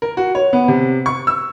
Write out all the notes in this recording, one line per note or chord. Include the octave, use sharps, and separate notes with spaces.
A#4
F#4
C#5
B3
C3
C#6
E6